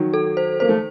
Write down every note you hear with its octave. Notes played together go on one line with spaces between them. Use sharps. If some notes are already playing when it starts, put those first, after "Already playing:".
Already playing: D#3 F#3
A4
C5
A#3 C5
A3